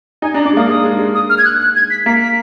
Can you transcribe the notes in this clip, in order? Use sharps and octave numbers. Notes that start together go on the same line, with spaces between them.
D#4 G#5
D4 A#5
D4 D6
G#3
A#3 D#6
G#3 D#6
G#3
G#3
D#6
F6
G#6
F#6
F#6
G#6
B6
A#3 B6
B6